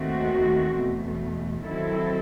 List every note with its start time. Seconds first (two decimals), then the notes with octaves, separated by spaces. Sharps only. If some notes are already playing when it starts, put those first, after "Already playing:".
Already playing: D#2 D#3 A3 C4 F#4
0.75 E2 B2 A3
1.64 D#3 F#3 C4 E4 A4